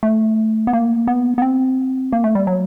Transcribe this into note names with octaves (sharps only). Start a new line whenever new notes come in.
A3
B3
A#3
B3
B3
C4
A#3
A3
G3
F#3